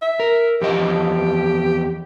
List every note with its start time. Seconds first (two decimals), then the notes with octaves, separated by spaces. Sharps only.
0.02 E5
0.20 A#4
0.61 E2 F3 G4 D#5